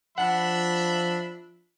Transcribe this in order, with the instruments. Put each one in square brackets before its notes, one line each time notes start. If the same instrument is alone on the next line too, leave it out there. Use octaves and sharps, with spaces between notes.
[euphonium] F3 [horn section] D4 E5 B5 [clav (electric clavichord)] F#5